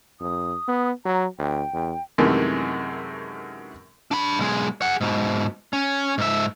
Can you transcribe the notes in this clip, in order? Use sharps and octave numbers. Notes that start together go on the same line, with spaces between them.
F2 D#6
B3
F#3 A#5
D2 G5
E2
F#2 C3 D#3 E3 G#3 A3
D4 B5
B1 G#3
G#4 F#5
G#2 B2
C#4
G#2 E5